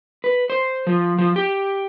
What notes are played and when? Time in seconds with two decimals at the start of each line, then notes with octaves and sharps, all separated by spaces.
0.24 B4
0.50 C5
0.87 F3
1.18 F3
1.36 G4